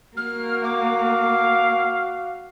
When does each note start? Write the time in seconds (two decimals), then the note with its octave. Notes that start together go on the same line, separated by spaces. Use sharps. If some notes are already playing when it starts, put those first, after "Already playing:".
0.17 A#3 F#4 F6
0.64 F5 D6